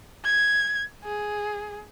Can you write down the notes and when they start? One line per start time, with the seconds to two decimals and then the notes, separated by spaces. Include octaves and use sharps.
0.25 G#6
1.04 G#4